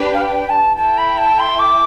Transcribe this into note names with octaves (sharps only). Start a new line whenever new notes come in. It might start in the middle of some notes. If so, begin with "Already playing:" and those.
Already playing: D4 G4 B4
F5
G5
A5
E4 A4 E5 G5 A5
B5
A5
C6
D6